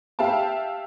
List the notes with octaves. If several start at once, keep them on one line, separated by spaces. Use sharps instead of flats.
G4 E5 F5 G5 A5